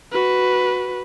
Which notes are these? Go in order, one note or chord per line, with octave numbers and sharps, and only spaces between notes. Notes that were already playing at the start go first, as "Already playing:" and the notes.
F#4 B4